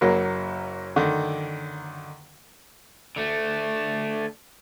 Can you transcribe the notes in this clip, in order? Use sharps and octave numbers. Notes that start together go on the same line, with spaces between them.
F#1 F#3 A#3
D3 D#3
D3 A3